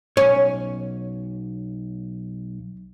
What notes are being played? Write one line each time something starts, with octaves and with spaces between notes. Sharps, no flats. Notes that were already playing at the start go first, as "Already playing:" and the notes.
B1 C#4 C#5